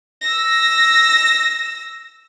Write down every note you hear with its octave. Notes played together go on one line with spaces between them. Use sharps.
E6 A#6